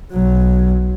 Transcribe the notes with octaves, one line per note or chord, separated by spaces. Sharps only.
B1 F#3